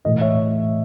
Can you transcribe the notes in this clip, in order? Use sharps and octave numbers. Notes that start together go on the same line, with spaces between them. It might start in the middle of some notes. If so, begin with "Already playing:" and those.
A2 E3 A3 D#5
C#5 E5